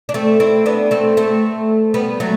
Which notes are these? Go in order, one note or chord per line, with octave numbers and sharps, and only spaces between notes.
D4
A3 C4
C4 E4
B3 D4
A3 C4
A3 C4
G3 B3
F#3 A3